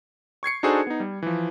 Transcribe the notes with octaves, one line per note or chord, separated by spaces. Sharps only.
C#6 G#6 C7 C#7
D4 D#4 F#4 G#4 A4 C5
B3 D#4
G3
E3 F3